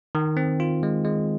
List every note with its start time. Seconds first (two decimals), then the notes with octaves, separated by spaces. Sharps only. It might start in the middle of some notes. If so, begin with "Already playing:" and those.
0.15 D#3
0.37 C4
0.60 F4
0.83 G#3
1.05 G#3